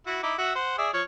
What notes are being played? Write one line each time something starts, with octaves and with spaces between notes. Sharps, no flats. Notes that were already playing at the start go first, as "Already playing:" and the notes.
E4 F#4
D#4 E4 D6
F#4 E5 F#5
C5 F#5
G#4 D5 E5
F3 C#5